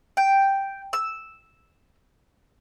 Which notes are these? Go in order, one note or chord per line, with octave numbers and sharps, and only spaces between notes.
G5
E6